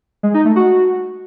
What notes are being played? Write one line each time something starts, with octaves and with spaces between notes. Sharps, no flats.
G#3
D#4
A3
F#4